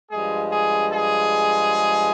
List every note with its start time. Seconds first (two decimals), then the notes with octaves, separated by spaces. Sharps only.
0.11 G2 F3 G#3 G#4
0.51 G#4
0.91 G#4